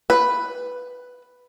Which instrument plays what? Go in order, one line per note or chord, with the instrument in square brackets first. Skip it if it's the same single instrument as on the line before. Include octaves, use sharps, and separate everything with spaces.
[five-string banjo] B4